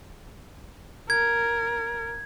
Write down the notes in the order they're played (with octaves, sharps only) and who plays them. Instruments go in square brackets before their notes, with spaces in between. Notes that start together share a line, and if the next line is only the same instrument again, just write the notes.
[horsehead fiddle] A#4 [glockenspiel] G#6